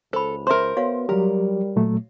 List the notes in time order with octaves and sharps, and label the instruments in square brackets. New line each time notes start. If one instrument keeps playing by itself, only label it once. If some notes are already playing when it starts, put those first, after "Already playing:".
[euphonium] C#2 [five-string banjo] A4 [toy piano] C5 B5
[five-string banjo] A#4 C5 [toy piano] E5 C6
[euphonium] B3 [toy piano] F#4 C#5 F5
[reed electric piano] F#3 G4 [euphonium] G3 [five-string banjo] A#4
[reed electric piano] A#2 F#3 A3